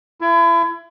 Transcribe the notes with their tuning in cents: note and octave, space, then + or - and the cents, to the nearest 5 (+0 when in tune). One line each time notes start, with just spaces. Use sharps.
E4 +35